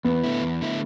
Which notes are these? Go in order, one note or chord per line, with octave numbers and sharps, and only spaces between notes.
E2 B3
D3 A3 E4
E2
D3 A3 E4